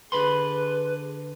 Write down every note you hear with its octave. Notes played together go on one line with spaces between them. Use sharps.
D3 G#4 B4 B5 C6